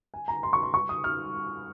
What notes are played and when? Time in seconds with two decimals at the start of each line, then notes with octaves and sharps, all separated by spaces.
0.14 G#5
0.28 A#5
0.43 C6
0.53 C#6
0.63 C6
0.74 C#6
0.89 D#6
1.04 F6